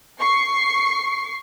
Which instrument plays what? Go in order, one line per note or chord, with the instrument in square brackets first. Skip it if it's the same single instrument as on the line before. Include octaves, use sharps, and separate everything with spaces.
[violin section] C#6 C7